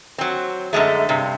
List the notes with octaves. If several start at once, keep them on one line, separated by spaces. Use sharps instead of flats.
F#3 C4
F#2 D3 G#3 A3
G2 C3